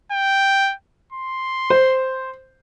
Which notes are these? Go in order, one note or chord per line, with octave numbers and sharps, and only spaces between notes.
G5
C6
C5